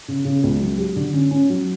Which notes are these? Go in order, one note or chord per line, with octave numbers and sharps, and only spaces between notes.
C#3
C#3
C#2
F#3
G4
D3
C#4
C#4
F#3